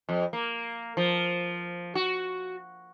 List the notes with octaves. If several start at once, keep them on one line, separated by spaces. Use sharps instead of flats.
F2
A#3
F3
F#4